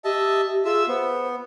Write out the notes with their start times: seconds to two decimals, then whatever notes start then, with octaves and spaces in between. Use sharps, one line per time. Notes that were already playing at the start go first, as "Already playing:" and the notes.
0.05 G4 D#5 E5 A5
0.65 F4 G#4 E5 E6
0.88 B3 C5